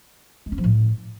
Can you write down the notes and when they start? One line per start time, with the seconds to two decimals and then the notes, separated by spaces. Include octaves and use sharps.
0.46 G#3
0.52 C#4
0.58 F3
0.64 A2